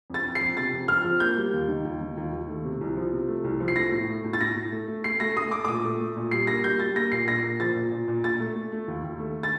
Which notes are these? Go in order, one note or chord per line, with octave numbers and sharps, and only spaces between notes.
F2 A6
F2
C7
F2
C3 A6
F2
F2 F6
F3
A#3 G6
G3
D#2
D#3
D#2
D#3
D#2
D#2
A3
C3
C2
F3
C3
A3
C2
F3
C7
A3 A#6
A2
A3
A2
A6
A2 A#6
A2
A3
A3
A3 C7
A3 A#6
A3 D#6
A3 D6
D6
A#2 D#6
A3
A3
A#2
G3 C7
A#3 A#6
G3 G6
G3 A6
A#3 A#6
A#2 C7
A#2 A#6
A#3
F3 A6
A#2
A#2
A#2
A#2 A6
A3
A3
A3
D#2
D#2
A3
A6